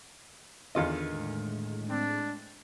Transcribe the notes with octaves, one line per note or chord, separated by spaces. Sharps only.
E2 D3 D#3 F4 B4 D#5 F5 G#6
A2 G#3
C4 D4